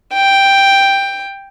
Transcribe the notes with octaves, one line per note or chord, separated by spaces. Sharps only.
G5